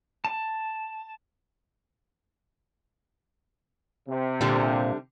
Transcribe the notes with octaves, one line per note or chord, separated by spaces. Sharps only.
A5
C3
A#2 D3 G3